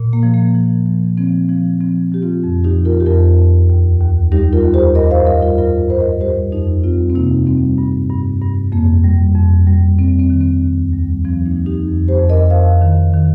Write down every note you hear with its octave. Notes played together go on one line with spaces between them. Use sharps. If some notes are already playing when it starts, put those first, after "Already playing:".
Already playing: A#2
A#3
F3
A#3
F3
F3
F3 C4
F3 C4
F3 C4
F3 G4
C4 F4
F2
D#4 G4
F3
F4 A#4
G4
F2 F4 A#4
F2
D#2
D#2
G3 D#4 G4
F4 A#4
D#2
G4 C5
G2 A#4 D#5
C5 F5
G3 A#4 D#5
F4 A#4
G2 F4 A#4
G2 C5
A#4 D#5
G3 G4 C5
F2 D#4 G4
G3 C4 F4
C4
C3 A#3 D#4
G3 C4
G2
G2
G2
F2 A#3
G3
F2
G3
G3 C4
C4
D#3
C4
D#2
G3
F3 C4
A#3 D#4
F3
D#4 G4
F2
G4 C5
F2
A#4 D#5
F2 C5 F5
D#3
D#3